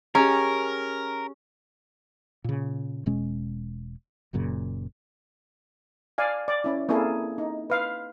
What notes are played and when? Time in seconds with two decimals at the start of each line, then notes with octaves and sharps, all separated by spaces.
0.15 C#4 G4 G#4 A#4 A#5
2.44 A#2 C#3
3.06 E1 B2 G#3 C#4
4.33 F#1 F#2 A#2 C#3
6.18 D5 F5 G#5
6.48 D5
6.64 C#4 E4
6.89 A#3 C4 E4 G#4 A4
7.38 D#4
7.70 B4 F5